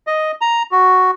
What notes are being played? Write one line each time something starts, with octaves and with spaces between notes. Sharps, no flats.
D#5
A#5
F#4